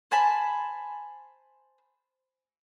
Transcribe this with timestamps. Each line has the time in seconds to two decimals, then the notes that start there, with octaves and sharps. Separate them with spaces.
0.11 C5 G#5 A5 B5